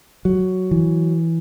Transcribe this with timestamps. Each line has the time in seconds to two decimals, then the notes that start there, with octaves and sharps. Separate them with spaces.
0.25 F#3
0.71 E3